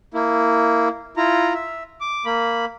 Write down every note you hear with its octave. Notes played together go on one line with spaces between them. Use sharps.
A#3 E4
E4 F4 A#5
E5
D6
A#3 B5